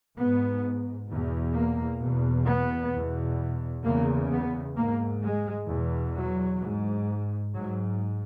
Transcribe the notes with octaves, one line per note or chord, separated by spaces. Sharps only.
G#2 B3
E2 B2
A#3
E2 B2
B3
E2 B2
E2 C#3 A#3
B3
G#2 A#3
G#3
E2 B2
F#3
G#2
G#2 F#3